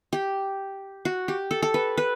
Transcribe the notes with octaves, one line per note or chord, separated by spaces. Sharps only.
G4
F#4
G4
A4
A4
B4
B4